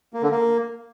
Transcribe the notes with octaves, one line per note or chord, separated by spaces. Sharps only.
A#3
D3
A#3